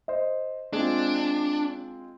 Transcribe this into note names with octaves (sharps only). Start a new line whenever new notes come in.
C5 D#5
G#3 C4 D4 F4